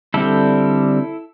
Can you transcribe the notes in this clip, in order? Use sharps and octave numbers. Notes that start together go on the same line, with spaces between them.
D3 G3 C4 E4 A4